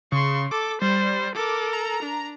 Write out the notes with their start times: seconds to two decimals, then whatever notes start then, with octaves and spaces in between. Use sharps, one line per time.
0.12 C#3 C6 C#6
0.51 A4 D6
0.82 G3 C5
1.35 A4 A#4 D6
1.73 A#5
2.03 D4